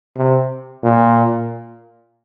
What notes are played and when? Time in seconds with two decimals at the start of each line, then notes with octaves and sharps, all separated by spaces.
0.17 C3
0.84 A#2